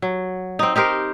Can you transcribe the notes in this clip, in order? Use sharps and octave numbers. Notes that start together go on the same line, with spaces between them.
F#3
C4 D#4
D#4 G4 A#4 C5